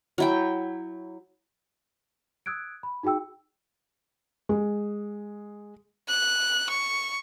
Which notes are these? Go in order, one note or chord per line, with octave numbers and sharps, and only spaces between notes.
F#3 E4 G5
D#6 E6 F#6 G#6 D7
B5
D#4 F#4 G#4 G5 E6
G#3
F#6
C#6